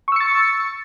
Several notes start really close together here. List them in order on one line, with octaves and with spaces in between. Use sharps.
C#6 E6 C#7 A6